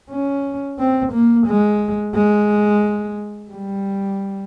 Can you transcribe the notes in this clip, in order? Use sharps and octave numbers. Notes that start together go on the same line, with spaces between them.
C#4
C4
A#3
G#3
G#3
G3